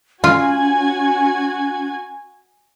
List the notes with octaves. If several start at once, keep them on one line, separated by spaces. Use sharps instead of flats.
C#4 F4 F#4 G#5 G#6